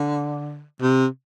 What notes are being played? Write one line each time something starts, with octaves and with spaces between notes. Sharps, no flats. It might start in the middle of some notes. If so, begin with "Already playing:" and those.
Already playing: D3
C3